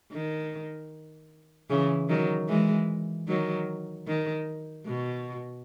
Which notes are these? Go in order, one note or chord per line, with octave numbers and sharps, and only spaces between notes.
D#3
C#3 E3
D#3 F#3
E3 G#3
D#3 F#3
D#3
B2